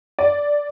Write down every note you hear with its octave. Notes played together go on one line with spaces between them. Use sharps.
D5